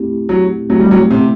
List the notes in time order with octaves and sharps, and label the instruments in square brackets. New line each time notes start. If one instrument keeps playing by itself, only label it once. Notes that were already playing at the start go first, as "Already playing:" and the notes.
Already playing: [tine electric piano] A3 C4 E4 G4
[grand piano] F#3
[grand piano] F#3 [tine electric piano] A3 C4 E4 G4
[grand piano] G3
F#3
C3